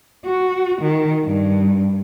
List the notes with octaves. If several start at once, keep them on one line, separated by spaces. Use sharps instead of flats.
F#4
D#3
G2